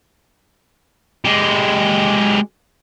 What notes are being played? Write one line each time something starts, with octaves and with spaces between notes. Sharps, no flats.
G#3 G4